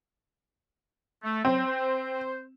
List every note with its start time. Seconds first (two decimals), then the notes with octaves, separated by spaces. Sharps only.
1.24 A3
1.45 F#3 C4 C5
1.66 C5